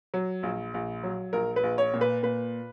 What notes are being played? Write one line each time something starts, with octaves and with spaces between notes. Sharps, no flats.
F#3
A#1
A#1
F#3
A#1 A#4
B4
A#1
C#5
A#2
B4
A#2 B4